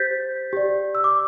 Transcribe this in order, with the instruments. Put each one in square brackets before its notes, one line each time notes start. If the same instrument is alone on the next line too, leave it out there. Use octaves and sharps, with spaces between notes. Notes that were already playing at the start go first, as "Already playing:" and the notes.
Already playing: [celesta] G4 C5 G6 A6 B6
G4 D5
E6
D6